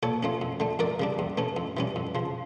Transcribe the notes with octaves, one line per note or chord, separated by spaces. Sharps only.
A#2 A4 C#5
F3 A3 C#4
F2
D3 A3
F2 A#4 D5
C#3 G3 D4
E2
E3 A3 C#4
F2
E3 G3 C#4
F2
C#3 F3